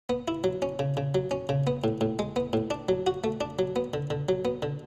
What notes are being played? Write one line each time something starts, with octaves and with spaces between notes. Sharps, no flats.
B3
E4
F#3
C#4
C#3
C#3
F#3
C#4
C#3
B3
A2
A2
G#3
B3
A2
D4
F#3
F#4
A3
D4
F#3
B3
D3
D3
F#3
B3
D3